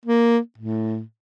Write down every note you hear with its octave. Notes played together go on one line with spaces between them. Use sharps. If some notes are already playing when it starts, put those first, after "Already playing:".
A#3
A2